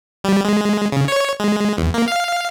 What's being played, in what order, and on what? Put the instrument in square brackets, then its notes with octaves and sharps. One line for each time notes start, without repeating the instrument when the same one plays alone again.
[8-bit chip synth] G3
G#3
C#3
C#5
G#3
E2
A#3
F5